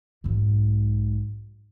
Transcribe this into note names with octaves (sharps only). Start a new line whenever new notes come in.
B1 G#2